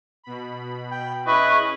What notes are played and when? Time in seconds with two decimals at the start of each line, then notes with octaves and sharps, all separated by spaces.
0.24 B2 B5
0.92 G5
1.26 C#4 E4 G#4 B4 D#5 C#6